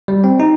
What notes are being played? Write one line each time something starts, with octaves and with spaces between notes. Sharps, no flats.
G3
C4
D#4